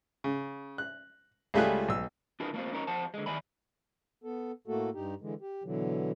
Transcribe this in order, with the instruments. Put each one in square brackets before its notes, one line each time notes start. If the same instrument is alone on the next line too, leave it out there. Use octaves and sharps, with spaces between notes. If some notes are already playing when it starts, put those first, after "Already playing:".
[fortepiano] C#3
F#6
C#2 G3 A3 F4 G#4 F#6
B1 E6
[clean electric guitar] D4 E4 F4 G#4 A#4 B4
A3 A#3 C4 F4 C5
C#4 D#4 A#4 C#5
F2 F3 C5 F#5 A5
D3 G#3
D#3 D5 E5 G#5 B5
[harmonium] B3 A4
A2 A3 A#3 F#4 A4
G2 D#4 G4
D3 E3 G#3
G4
B2 D3 E3 F#3